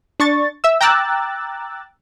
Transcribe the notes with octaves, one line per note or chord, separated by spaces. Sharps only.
D4 C#6 A6
E5 E6
G5 A#5 D6 E6 F#6 A6